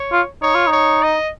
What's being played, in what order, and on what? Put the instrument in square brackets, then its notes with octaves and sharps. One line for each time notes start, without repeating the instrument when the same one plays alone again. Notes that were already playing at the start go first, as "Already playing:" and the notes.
Already playing: [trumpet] C#5
[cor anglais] F4
[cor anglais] D#4 [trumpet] C#5
[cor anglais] F4
D#4
[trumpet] C#5
D#5